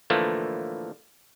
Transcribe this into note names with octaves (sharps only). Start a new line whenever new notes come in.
A2 D3 E3 F3 A3 A#3